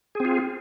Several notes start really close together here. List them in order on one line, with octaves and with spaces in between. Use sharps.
G#4 C4 F4